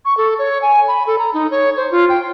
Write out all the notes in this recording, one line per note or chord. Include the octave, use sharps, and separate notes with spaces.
C#6
A4
C#5
G#5
B5
A4
A#5
D#4
C#5
C5
F4
G5